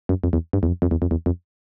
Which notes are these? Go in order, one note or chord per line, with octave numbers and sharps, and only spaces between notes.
F#2
F2
E2
G2
E2
F2
F2
E2
F2
E2
F2